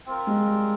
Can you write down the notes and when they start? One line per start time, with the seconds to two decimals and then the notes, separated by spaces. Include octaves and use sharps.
0.06 C4 F4 A#4
0.27 G#3
0.47 G3